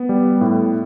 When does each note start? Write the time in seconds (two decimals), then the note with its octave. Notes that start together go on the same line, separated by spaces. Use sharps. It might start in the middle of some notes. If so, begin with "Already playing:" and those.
Already playing: B3
0.09 G3
0.41 A2